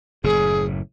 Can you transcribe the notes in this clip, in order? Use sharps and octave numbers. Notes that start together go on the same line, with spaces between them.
F#1 A2 G#4